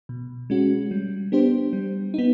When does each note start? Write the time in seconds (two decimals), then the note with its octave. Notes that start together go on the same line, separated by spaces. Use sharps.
0.09 B2
0.50 G#3 C#4 F#4
0.91 G3
1.32 B3 D4 G4 C5
1.73 G3
2.14 B3 D#4